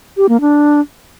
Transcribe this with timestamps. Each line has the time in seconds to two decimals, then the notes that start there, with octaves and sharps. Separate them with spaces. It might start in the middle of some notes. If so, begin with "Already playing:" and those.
0.17 G4
0.29 A#3
0.41 D4